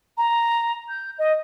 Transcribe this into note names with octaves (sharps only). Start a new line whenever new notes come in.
A#5
G6
D#5